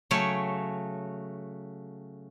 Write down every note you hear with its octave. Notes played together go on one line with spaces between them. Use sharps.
C#3 F#3 A3 C#5 G5